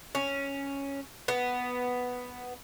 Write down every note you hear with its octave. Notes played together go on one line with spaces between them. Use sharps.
C#4
B3